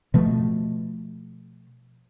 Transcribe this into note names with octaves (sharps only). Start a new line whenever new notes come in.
B2 F3 A3